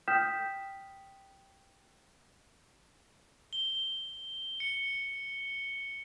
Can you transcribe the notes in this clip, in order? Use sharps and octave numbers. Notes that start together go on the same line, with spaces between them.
G5 D#6 F6 G6 B6 E7
G7
C#7